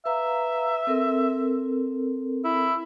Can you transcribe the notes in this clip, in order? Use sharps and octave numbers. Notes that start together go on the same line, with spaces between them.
B4 E5 F5 A#5
C4 A4 A#4
E4